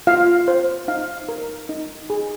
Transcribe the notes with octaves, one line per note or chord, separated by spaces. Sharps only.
F4 F5
C5
D#4 F5
A#4
D#4
G#4